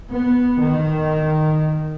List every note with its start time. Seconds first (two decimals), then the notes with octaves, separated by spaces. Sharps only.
0.10 B3
0.59 D#3